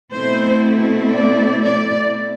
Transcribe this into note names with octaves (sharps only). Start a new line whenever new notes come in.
B2 A3 C4 E4 C5
D5
D5